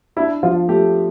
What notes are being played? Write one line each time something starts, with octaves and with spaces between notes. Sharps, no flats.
D4 E4
F3 F4
A3 G4